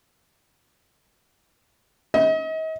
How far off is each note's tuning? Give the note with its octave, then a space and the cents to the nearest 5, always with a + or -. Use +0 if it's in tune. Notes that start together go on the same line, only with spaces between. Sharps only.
D#5 +40